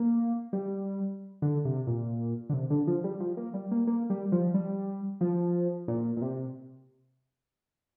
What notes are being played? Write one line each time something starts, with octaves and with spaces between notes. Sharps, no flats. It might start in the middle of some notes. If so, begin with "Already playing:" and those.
Already playing: A#3
G3
D3
C3
A#2
D3
C3
D3
F3
G3
F3
A#3
G3
A#3
A#3
G3
F3
G3
F3
A#2
A#2
C3